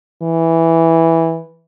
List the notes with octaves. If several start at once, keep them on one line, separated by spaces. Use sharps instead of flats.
E3